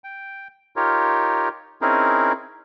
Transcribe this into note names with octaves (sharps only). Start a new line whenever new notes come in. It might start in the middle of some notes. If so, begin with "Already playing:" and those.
G5
D#4 F4 G4 A#4 C#5
C4 C#4 D#4 E4 G#4 A#4